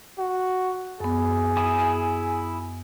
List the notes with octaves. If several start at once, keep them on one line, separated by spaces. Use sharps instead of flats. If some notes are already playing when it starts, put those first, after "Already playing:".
F#4
F#2 B3 G#4
E4 G#5 D#6